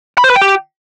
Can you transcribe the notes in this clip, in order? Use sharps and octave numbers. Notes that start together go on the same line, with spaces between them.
B5
C5
B4
G5
G4